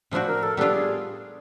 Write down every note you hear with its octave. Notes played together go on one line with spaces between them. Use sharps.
A2 F3 A3 D4 F#4 C5
A#4
A4
G3 B3 D4 F4 A4
G#4